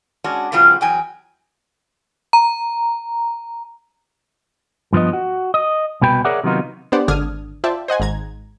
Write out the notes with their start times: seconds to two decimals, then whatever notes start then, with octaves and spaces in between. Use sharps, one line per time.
0.24 G#3 C#4 D4 F#4
0.52 C#3 F3 G3 B3 F4 F#4
0.81 E2 F#3 G5 G#5
2.33 A#5
4.93 G2 F3 B3 D#5
5.13 F#4
5.54 D#5
6.02 C2 B2 B4 G5 B5
6.25 G#4 A#4 C#5 D5 E5 F#5
6.44 C3 D#3 F#3 B3 D#4 F4
6.92 B3 D4 G4 C5 D5 F#5
7.08 G#1 D3 D4 D#6 F6 G#6
7.64 F4 C5 D5 E5 G5 A5
7.88 C5 D#5 F#5 G#5
8.00 G#1 G#2 A#5 G#6